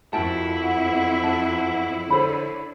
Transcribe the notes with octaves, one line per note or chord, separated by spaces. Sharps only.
F2 E4 F#4 A#4 G5 A5
F#5
A5
D3 A4 C5 C#5 B5